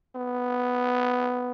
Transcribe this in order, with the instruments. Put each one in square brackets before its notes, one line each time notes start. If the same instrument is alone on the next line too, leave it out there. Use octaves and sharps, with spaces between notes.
[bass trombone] B3